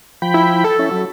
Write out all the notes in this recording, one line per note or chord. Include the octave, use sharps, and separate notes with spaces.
F3 G5 B5
E4
A4
C#4 E4
F#3